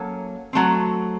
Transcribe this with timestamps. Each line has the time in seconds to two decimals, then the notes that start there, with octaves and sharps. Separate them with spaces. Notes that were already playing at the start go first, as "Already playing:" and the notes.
Already playing: F#3 A#3 C#4 A4
0.53 F#3 A3 C4